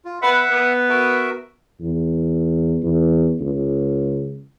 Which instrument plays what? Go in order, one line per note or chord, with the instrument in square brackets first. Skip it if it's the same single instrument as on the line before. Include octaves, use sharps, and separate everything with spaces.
[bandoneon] F4
[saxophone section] B3 B4 [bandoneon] E5 F#5
[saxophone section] B3
[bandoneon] F#4 A#4 E5
[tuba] E2
E2
C#2